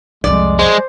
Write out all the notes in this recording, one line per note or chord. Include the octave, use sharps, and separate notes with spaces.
C2 F2 G#3 D5
G#3 C5